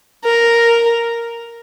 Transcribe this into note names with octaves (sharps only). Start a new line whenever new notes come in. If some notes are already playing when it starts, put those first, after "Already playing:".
A#4